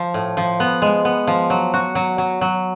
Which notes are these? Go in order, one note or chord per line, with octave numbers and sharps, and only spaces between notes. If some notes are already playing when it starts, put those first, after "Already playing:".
Already playing: F3
A2
F3
B3
G#3
B3
F3
F#3
F#4
F#3
F#3
F#3